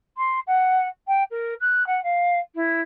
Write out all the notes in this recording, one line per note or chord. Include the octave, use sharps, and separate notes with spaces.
C6
F#5
G5
A#4
F#6
F#5
F5
E4